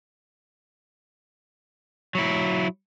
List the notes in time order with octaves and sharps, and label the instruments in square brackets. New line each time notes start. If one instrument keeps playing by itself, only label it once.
[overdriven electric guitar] F#3 E4